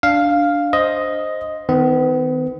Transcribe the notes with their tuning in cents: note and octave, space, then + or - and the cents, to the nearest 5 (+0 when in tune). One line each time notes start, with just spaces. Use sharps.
D4 -5 F5 +0
C5 +0 D#5 +5
D#3 +10 B3 +45